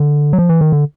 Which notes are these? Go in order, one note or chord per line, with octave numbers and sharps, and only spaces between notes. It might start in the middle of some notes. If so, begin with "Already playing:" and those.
Already playing: D3
F#3
F3
E3
D#3
D3